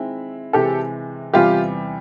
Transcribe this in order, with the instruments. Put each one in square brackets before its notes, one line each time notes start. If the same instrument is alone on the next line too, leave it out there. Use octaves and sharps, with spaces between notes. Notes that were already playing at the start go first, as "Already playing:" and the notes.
Already playing: [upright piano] D#3 G#3 C4 E4
[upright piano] C3 E3 G#3 [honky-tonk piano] G4 A4
[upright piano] E2 C3 E3 G3 [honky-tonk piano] F4 G4